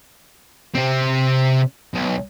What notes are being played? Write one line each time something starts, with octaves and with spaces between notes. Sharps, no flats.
C3 C4
B1